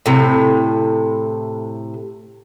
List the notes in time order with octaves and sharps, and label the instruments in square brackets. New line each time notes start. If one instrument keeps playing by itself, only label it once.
[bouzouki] A2 C3